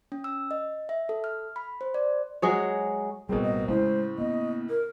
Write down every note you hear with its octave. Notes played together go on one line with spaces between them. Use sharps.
C#4
E6
D#5
E5
A4
F6
B5
C5
D5
F#3 G#3 G#4 C#5
A1 B2 G3 A#3 C4 G#4
D#5
A2 C#3 G#3 C5
A#3 B3 D#5
A#4